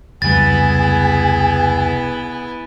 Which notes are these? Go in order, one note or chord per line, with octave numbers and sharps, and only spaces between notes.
F1 C#2 G3 B3 E4 G#4 A6